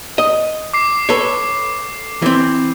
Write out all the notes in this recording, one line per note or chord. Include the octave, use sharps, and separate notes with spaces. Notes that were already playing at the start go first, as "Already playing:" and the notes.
D#5
D6 C7
A4 B4 C#5
E3 C4